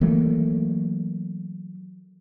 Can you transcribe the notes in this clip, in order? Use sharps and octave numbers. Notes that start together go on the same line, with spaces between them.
E3 F#3 A3 A#3